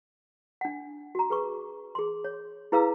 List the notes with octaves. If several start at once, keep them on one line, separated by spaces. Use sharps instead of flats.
D4 F#5
F#4 A#5
G#4 B4 C#6
G#4 C6
C#5
E4 G#4 B4 F5 A#5 E6